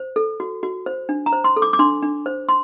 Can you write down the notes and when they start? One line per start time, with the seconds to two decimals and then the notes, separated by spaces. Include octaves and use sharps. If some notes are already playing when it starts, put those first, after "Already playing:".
Already playing: C5
0.16 A4
0.40 F#4
0.63 F#4
0.86 C5
1.09 D4
1.26 A#5
1.33 C5
1.44 C6
1.56 A4
1.62 D6
1.73 D6
1.79 D4 C6
2.03 D4
2.26 C5
2.49 C6